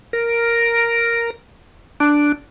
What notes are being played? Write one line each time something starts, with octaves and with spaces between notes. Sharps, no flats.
A#4
D4